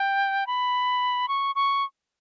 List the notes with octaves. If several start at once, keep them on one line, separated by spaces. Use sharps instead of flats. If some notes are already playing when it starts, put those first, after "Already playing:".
Already playing: G5
B5
C#6
C#6